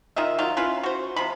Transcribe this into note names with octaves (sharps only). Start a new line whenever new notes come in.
D#3 F4 D#5 E5
D#3 F#3 F4
C#4 E4 F4 B4
F#4 C5
C3 F3 B5